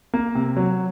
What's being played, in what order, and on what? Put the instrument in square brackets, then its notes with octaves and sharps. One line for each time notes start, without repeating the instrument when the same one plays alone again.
[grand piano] A#3
C3
F#3